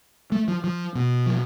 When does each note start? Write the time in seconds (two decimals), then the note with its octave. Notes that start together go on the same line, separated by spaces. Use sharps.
0.32 A3
0.48 F3
0.64 F3
0.95 B2
1.26 F3